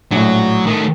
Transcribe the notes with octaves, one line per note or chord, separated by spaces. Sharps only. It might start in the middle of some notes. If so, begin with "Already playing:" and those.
A#1 A2 F#3
D#3 A3